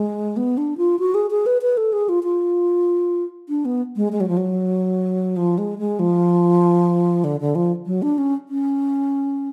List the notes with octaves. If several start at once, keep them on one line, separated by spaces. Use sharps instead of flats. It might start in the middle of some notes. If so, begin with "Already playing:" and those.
Already playing: G#3
B3
D4
F4
F#4
G#4
G#4
B4
B4
A4
G#4
F4
F4
D4
B3
G#3
G#3
F#3
F3
F#3
F3
G#3
G#3
F3
D3
D3
F3
F#3
D4
C#4
C#4